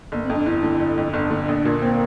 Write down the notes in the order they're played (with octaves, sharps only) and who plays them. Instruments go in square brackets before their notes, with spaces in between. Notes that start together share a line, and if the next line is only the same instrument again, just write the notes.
[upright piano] G1 [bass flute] A#3
[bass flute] C4
[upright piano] F2
[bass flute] D4
[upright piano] G1 [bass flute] E4
[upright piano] D3
G1
F2
[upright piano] G1 [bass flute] D4
[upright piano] D3
A#1
A#2
[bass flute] A#3 [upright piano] C4